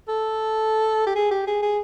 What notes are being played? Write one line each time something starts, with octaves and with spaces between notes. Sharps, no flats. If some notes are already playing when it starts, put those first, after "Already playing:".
A4
G4
G#4
G4
G#4
G#4